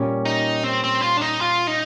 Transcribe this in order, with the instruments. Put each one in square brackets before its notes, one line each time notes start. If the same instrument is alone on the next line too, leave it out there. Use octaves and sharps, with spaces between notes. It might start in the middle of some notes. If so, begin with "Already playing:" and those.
Already playing: [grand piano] A#2 G3 A#3 C#4
[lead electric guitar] D#4
C4
C4
F4
D4
D#4
F4
D#4